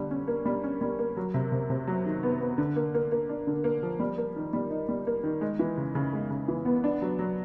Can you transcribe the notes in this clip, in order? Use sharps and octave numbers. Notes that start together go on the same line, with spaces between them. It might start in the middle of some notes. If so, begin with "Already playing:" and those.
Already playing: D3 G3
C#4
A#3
G3
C#4
G3
A#3
F#3
C3
C3
C3
F#3
D#3
B3
B3
D3
A#3
A#3
A#3
D4
D3
A#3
F3
G3
A#3
D#3
G3
D#4
G3
A#3
D#3
G#3
E3
C#3
C#3
G#3
C#3
E3
B3
D4
F#3
F#3